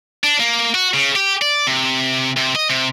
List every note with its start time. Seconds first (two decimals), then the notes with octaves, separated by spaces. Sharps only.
0.24 D4
0.40 A#3
0.74 F#4
0.94 C#3
1.16 G4
1.42 D5
1.67 C3
2.37 C3
2.56 D#5
2.70 C3